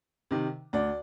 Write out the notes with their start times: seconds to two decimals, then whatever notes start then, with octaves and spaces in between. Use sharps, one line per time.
0.31 C3 D#3
0.73 D2 D5